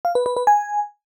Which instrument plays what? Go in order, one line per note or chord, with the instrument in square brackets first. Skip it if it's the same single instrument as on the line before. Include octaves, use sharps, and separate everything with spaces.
[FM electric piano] F5
B4
B4
B4
G#5